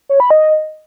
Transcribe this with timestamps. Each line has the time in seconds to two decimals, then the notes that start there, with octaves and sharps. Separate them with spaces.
0.09 C#5
0.20 B5
0.30 D#5